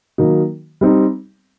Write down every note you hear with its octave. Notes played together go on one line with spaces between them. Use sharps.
D#3 F#3 A#3 D#4
G3 C4 D#4